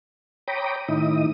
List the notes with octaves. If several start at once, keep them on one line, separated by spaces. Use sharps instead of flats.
C#5 G5 A#5 B5 D6 D#6
A2 D#3 D#4 E4 D#6